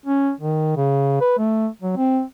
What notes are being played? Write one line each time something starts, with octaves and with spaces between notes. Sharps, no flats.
C#4
D#3
C#3
B4
A3
F#3
C4